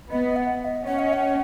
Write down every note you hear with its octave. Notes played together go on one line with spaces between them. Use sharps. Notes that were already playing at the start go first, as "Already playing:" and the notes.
B3 D#5
F#5
F#5
D#5
C#4 F#5
D#5
F#5